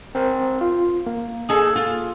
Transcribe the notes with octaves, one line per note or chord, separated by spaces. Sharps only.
C4 A#4 C5
F4
A#3
D#4 G#4 A4
F4